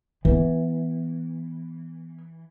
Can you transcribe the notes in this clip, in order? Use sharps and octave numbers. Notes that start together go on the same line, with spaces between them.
E3 B3